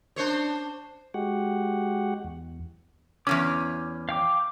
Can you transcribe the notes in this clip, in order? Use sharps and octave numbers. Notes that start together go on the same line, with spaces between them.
D4 C5 C#5
G#3 F#4 G4 F#5
E2
E2 G#2 C#4 D6 F6
F5 G5 D6